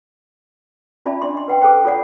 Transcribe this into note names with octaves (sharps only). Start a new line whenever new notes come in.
C#4 F4 D5 E5 A5 B5
D4 D5 C6
D#5 C6
B4 F#5 G5
G#4 A4 B4 C5 G5
F4 A4 C#5 D5 F#5